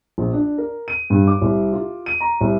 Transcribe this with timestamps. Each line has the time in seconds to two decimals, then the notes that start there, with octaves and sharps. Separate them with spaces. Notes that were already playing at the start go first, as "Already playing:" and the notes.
0.18 A#1
0.33 D4
0.58 A#4
0.88 D#7
1.10 G2
1.27 D6
1.42 C2
1.73 F4
2.06 D#7
2.20 A#5
2.41 C2